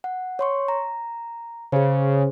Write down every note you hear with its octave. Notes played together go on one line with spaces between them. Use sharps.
F#5
C#5 C6 C#6
A#5
C#3 G#4 C5